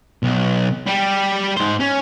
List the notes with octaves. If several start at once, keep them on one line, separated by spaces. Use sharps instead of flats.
B1
G3 G4
G#2 C5
C#4